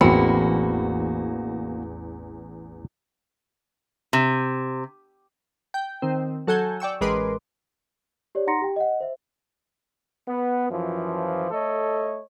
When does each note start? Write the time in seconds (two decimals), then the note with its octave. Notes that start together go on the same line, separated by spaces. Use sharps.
0.01 A1 E2 A#3 C4 F#4 B5 C#7
4.13 C3
5.74 G5
6.02 D#3 C4
6.47 F#3 A4 F#5 G#5 G6
6.80 D5 G5 C#6 E6
7.01 A1 G#3 A#4 B4 C6 D6
8.35 G4 C#5 D5
8.47 D#4 F#5 A#5 C6 A#6 C#7
8.62 G4 G5
8.76 D#5 F#5
9.00 C5 E5
10.28 B3
10.70 F#2 E3 F3
11.51 A3 A4 C#5 D#5